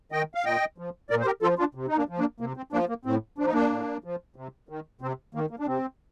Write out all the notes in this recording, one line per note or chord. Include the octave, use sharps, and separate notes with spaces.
D#3 D#5 G5
F5
A#2 D#5 G5
F3
A#2 A#4 D5
C5
G4 A#4
F3 F4 A4
D4 F4
C3
D#4
A#3 D4
F3
A#3 D4
C3 A#3
C4
F3 A#3 D4
A#3
A2 C4
F3 D4
D#4
A#3 D4
A2
F3
C3
D#3
C3 C4
D#3 A#3
A#3
D4
C3 C4